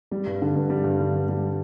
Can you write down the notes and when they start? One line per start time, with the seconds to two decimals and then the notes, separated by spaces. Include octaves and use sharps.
0.11 G3
0.27 G2
0.42 D3
0.56 G2
0.70 G3
0.84 G2
1.00 D3
1.14 G2
1.29 G3